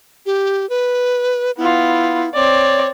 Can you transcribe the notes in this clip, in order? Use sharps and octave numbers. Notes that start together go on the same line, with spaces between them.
G4
B4
B3 E4 F4
C4 C#5 D5